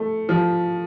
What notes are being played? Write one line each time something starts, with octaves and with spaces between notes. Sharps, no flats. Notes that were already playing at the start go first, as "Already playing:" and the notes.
Already playing: A3
F3